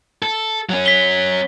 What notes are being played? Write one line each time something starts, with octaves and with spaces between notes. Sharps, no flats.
A4
F#3 C#4
B6 G7